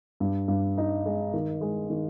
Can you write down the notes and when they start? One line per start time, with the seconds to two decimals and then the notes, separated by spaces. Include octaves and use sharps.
0.20 G2
0.48 G2
0.78 D#4
1.06 G#3
1.34 D#3
1.61 G#3
1.90 D#3